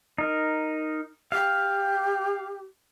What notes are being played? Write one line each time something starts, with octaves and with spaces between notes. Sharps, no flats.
D#4 A#4
G4 F5